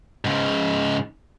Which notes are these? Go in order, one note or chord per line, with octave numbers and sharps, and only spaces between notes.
G#2 C#3